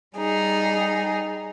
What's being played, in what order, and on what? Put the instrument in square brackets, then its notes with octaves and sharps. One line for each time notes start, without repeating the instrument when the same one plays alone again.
[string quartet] G3 D#4 G#4